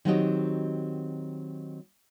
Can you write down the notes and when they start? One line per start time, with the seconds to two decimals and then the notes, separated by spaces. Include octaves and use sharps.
0.05 D#3 F#3 C4 F#4 G4 D#5